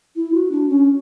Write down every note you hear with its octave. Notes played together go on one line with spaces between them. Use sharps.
E4
F#4
D4
C#4